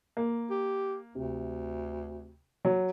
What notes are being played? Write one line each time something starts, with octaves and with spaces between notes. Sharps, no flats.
A#3
G4
D2 C3
F#3